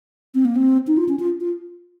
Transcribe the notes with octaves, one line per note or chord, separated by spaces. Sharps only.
C4
A#3
C4
D#4
F4
C#4
F4
F4